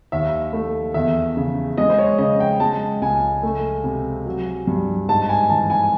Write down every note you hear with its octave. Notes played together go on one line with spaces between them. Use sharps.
D#2 E5
A3
E2 E5
C#3
G#3 D#5
C5
C#5
C#3 D#5
G5
G#3 A5
C#2 G#5
A3
C3
F#3
G2
G#2 A5
G#5
E3 A5
G#5